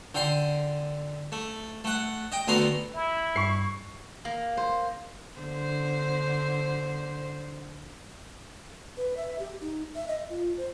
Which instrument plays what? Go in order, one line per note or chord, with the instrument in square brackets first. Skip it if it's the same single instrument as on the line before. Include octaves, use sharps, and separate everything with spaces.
[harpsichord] D3 G5 C6
A3
A3 F#5
D#5 G5
D2 A3 B3 A#5 C6
[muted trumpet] E4
[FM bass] G2 [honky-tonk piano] C#6 C7
[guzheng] A#3
C5
[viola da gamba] D3 C5
[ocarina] B4
E5
G4
D#4
E5
D#5
F4
C5